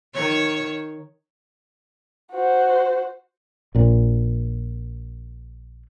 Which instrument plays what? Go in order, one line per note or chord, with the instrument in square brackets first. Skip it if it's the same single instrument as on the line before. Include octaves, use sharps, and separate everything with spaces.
[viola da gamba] D#3 C#5
[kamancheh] F#4 C5
[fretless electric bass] A#1 A#2